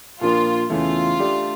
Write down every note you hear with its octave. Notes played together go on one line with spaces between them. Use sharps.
A#2 F3 A#3 D4 F4
E2 C#3 E3 A3 E4 F4
A3 D4 G4 D5